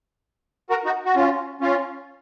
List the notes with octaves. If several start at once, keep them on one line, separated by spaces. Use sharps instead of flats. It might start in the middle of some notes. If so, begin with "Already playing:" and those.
F#4 A#4
D#4 F#4
F#4
C#4 F4
C#4 F4